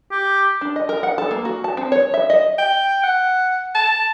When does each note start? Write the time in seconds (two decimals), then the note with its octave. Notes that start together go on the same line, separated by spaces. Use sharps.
0.11 G4
0.61 D4
0.76 D#5
0.89 A#4
1.03 F#5
1.18 A4
1.31 A#3
1.45 F#4
1.64 A5
1.77 C4
1.92 C#5
2.14 E5
2.30 D#5
2.58 G5
3.03 F#5
3.75 A5